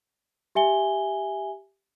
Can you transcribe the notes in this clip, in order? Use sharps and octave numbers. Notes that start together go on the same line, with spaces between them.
G4 E5 G#5 G7